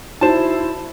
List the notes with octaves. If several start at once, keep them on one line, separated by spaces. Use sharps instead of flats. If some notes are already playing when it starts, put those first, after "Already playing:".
D#4 E4 F#4 C5 A5 E7